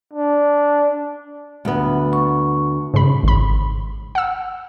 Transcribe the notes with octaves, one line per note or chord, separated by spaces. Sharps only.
D4
D2 B3
C#6
G#2 C#3 B5
G#1 B5
F#5 E6